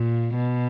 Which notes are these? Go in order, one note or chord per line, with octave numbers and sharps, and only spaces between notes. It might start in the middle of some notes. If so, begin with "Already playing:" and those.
Already playing: A#2
B2